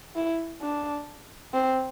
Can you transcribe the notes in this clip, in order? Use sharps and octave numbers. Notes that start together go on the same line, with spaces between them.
E4
D4
C4